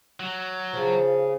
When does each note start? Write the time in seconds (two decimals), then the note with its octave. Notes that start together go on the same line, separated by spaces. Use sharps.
0.20 F#3
0.73 C#3 F3